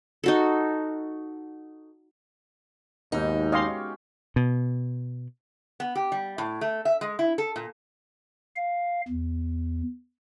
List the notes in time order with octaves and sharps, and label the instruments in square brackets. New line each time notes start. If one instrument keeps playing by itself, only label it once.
[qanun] D#4 F#4 A4
[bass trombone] D#2 [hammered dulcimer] G#2 B2 [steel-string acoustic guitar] D#4
[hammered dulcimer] C#4 G4 [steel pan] D#5 F5 C6
[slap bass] B2
[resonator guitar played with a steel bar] B3
G4
G3
A2
A3
E5
G#3
E4
A4
A#2
[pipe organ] F5
E2